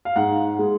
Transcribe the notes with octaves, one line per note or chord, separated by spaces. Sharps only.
F5
G#2 F#5
G#3